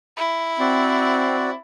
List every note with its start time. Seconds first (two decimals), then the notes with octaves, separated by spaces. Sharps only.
0.17 E4
0.60 C4 F#4 D5